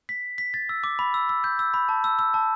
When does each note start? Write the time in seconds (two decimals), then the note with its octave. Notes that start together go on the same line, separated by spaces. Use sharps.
0.09 B6
0.38 B6
0.54 A6
0.69 E6
0.84 D6
0.99 B5
1.14 E6
1.29 E6
1.44 G6
1.59 E6
1.74 B5
1.89 A5
2.04 E6
2.19 E6
2.34 A5